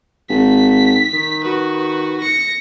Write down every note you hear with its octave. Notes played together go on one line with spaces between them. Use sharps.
G#1 B6
D#3
F#4 B4
A#6 C#7